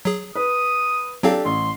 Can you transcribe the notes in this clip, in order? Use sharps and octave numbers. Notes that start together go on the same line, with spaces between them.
F#3 G#4
B4 D#6
F#3 C4 D4 G4 A4 F5
A1 C6